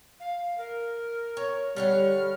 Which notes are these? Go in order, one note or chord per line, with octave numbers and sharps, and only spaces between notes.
F5
A#4
C#5
D3 G3 C#5 F#5 F6